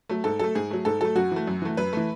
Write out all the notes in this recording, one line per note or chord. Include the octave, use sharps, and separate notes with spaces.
F#3 A3
G#2 A4
F#3 A3 A4
G#2 G#4
F#3 A3
G#2 A4
F#3 A3 A4
F#2 F#4
E3 A3
F#2
E3 A3
F#2 B4
E3 A3